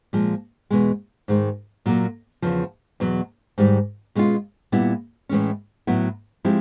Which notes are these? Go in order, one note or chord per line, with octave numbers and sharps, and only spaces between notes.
A#2 F3 G#3
E2 B2 G#3
G#2 D#3 G#3
A#2 F#3 A#3
E2 C#3 F3
E2 B2 F#3
G#2 D#3 G3
B2 G#3 C#4 F4
A#2 G3 B3 E4
A2 E3 G#3 C#4
A2 F#3 B3 E4
F3 G#3 C4 E4 G4